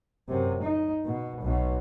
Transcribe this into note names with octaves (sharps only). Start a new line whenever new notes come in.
F#2 C3
D#4
B2
B1 B2